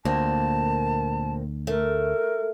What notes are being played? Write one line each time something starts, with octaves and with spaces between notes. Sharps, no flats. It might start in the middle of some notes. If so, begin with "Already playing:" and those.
D2 A#2 A#3 C4 A5
A3 A#4